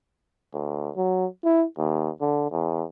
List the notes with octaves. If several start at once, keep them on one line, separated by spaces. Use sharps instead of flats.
D2
F#3
E4
D#2
D3
E2